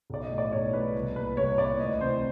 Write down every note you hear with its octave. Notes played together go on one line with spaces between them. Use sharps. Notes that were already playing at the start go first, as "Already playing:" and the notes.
B1 D5
D#5
A2 E3
D5
B1 C#5
A2 E3 B4
C2
A#2 B4
C2 C#5
A#2 D5
D2 D#5
C3 E3 C5